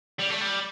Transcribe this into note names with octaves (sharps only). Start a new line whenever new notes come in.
G3
A3
G3